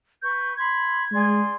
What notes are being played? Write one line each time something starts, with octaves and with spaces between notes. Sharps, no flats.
B4 C#6 G6
B5 C6 G#6
G#3 G#4 D5 C6